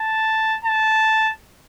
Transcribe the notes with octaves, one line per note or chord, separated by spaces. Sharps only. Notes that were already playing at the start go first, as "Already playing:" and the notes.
Already playing: A5
A5